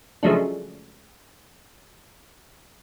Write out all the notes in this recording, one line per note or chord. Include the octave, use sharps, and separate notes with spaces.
C#3 F3 F#3 G#3 A3 D4